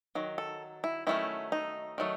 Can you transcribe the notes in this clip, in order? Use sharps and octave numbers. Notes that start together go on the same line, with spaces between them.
D#3 F#3
A4
E4
D#3 F#3 A3 C#4 E4
D#4
D#3 F#3 A3